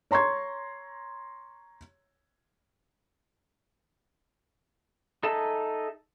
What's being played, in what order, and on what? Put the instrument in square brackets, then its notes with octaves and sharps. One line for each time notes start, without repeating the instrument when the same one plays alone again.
[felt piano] C#5 A#5 C6 C#6 G#6
[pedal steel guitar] D#4 G#4 A4 E5 A5